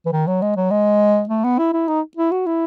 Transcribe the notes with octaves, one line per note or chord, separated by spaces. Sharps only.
E3
D#3
F#3
G#3
F#3
G#3
A3
B3
E4
E4
D#4
E4
F#4
E4